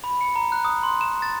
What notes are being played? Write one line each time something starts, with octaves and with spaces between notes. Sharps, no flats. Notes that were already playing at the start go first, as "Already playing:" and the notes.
B5
C#7
A#5
F#6
D#6
C6
E7
A6